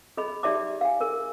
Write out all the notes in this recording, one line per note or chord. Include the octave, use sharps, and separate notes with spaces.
G#4 D#5 B5
D#4 G4 D5 E5 A5 D6
F5 G#5
G#4 A#4